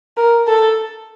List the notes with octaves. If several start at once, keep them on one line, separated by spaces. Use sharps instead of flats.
A#4
A4